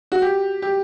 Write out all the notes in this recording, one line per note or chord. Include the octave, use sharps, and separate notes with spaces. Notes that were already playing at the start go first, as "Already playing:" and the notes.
F#4
G4
G4